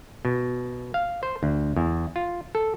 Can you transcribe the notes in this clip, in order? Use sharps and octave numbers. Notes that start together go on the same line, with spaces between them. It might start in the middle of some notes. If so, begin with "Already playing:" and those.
B2
F5
C5
D2
E2
F4
A4